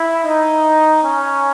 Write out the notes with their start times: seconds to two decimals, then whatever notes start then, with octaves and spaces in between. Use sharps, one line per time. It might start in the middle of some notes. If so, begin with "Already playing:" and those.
Already playing: E4
0.24 D#4
1.04 C#4